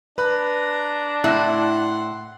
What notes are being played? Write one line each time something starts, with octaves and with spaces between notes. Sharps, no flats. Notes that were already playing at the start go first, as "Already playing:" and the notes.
D4 B4 A#5 B5 F#6
A2 E4 F#5 C6 F#6 A#6